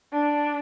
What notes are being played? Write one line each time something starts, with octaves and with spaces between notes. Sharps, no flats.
D4